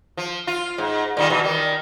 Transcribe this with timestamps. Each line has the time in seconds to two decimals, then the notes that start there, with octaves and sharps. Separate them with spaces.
0.17 F3
0.47 F4
0.78 G#2
1.17 A#2 D#3 G3
1.30 B2 E3
1.44 D#3 G3